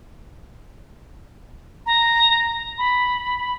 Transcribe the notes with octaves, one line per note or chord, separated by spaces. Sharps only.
A#5
B5